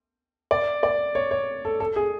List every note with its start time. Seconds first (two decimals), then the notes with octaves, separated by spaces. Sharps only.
0.51 D5
0.83 D5
1.15 C#5
1.31 C#5
1.65 A4
1.80 A4
1.96 G#4